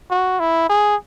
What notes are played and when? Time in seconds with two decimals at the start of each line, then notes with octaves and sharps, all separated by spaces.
0.11 F#4
0.40 E4
0.70 G#4